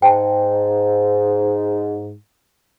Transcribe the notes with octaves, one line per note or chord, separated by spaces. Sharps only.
G#2 G5 A5